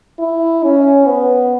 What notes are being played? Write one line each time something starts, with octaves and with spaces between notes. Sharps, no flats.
E4
C#4
B3